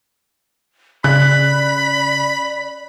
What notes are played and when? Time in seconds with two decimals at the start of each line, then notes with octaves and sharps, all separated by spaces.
1.04 C#3 D5 B5 F#6